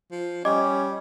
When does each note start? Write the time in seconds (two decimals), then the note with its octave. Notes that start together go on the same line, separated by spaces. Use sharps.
0.11 F3
0.45 G3 C#4 D#5 D6